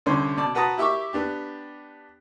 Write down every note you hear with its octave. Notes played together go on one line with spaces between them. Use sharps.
C2 D3 C#4 C5
B2 D5 A5
F#4 B4 F#5 A5 A#5 D#6
E4 G4 E5 C#6 D6 E6
B3 D4 G4